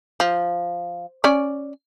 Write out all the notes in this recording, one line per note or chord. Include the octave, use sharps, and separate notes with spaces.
F3
C#4 D5